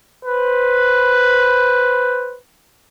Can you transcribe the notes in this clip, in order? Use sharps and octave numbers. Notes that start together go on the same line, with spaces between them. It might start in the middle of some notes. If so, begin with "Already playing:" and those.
B4 C5